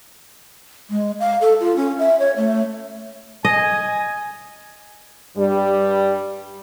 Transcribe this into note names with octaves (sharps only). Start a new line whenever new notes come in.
G#3
F5
A4
F4
C#4
E5
C#5
A3
D#5 G#5
G2 G3